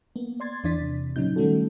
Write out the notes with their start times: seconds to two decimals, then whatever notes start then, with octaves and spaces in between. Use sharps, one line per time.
0.16 A#3 B3
0.40 D5 C6 G#6 A6
0.64 E2 E3 D4 D5 A6 B6
0.82 C3
1.16 A#2 C#3 F#3 C#4 D#4 G6
1.36 D#3 G3 A3 C#4 F#4 A4